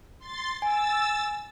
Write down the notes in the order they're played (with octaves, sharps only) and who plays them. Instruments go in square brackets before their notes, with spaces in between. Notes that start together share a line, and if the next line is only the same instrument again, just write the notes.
[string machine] C6 A6
[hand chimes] G#5 [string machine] E6 A6